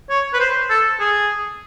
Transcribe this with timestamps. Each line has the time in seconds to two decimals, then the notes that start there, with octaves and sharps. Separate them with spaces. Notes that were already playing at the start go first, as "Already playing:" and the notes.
0.10 C#5
0.33 B4
0.40 C5
0.70 A4
1.00 G#4